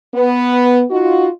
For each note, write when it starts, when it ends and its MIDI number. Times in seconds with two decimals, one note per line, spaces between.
0.13 0.82 59
0.91 1.28 63
0.91 1.28 65
0.91 1.28 66